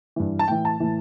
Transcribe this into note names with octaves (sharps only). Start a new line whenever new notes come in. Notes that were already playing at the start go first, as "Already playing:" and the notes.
G2 E3
A5
A2 E3 G5
A5
A2 E3